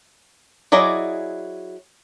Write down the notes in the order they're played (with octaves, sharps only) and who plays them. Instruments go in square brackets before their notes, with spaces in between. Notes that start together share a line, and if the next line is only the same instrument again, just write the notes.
[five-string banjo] F#3 E4 G#4 D5 D#5